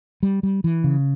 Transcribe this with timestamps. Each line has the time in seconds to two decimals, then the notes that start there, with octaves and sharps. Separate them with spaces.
0.23 G3
0.43 G3
0.64 E3
0.84 C#3